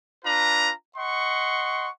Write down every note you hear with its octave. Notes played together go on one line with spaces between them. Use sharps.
D4 F4 B4 A#5
D#5 F#5 C6 C#6